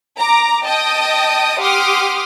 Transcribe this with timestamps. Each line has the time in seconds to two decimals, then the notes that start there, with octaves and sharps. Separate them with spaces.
0.18 A#5 D6
0.65 D#5 G5 A5 D#6
1.59 G4 F#5 C6 D6 D#6 F6